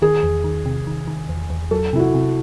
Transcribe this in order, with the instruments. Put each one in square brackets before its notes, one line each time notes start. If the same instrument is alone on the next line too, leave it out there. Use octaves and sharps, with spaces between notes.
[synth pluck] D#3 [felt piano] G#4
[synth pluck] E2
D#3
C3
D#3
D#3
E2
E2
[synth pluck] F#3 [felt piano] A4
[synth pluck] C3 [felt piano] E4
[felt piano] F#4
[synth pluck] C3